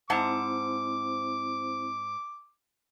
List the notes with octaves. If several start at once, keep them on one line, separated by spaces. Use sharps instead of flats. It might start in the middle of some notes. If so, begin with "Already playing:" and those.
G#2 C4 E4 C5 F#5 A5 D6